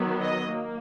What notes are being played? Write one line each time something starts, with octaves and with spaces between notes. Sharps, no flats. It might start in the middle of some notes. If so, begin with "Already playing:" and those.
Already playing: D#3 F#3 B3
D#5
A#3